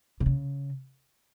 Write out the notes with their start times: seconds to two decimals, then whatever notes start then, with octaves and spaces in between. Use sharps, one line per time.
0.20 C3
0.26 C#3